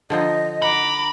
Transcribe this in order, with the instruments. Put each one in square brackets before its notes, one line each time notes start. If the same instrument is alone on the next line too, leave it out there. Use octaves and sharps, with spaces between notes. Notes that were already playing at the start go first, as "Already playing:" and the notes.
[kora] D3 F3 D#4 [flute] D#5
[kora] F#5 [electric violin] A#5 D6 [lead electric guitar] B5